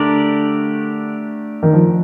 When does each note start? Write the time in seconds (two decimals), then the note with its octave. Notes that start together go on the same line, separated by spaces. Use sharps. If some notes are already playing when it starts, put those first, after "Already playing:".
Already playing: D3 A3 D4 G4 A#4 D5
1.63 D#3
1.73 F3